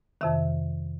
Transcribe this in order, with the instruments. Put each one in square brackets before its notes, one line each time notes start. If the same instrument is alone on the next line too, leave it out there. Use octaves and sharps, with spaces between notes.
[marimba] F2 C3 D#3 E5